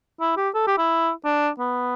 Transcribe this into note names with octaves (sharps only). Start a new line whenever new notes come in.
E4
G4
A4
G4
E4
D4
B3